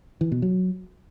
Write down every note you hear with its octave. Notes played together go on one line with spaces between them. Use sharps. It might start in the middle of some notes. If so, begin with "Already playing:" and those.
E3
B2
F#3